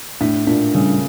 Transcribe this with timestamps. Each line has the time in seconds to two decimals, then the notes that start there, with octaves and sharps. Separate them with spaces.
0.21 A2 D4
0.47 A#2 D4
0.74 C#3 G3